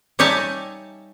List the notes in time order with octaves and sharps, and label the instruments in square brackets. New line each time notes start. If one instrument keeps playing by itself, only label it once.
[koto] G3 D#4 C#5 E5 G#5 A5